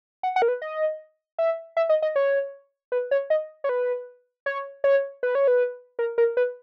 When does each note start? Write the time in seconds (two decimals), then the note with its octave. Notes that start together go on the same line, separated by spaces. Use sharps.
0.23 F#5
0.36 F#5
0.42 A#4
0.48 B4
0.62 D#5
1.39 E5
1.77 E5
1.89 D#5
2.02 D#5
2.16 C#5
2.92 B4
3.11 C#5
3.30 D#5
3.64 C#5
3.69 B4
4.46 C#5
4.84 C#5
5.23 B4
5.35 C#5
5.48 B4
5.99 A#4
6.18 A#4
6.37 B4